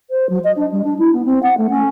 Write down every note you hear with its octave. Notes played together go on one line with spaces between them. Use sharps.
C5
F#3
D#5
D4
G3
D4
E4
B3
C4
F#5
A3
C#4